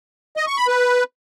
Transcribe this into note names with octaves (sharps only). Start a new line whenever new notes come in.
D#5
C#6
B5
B4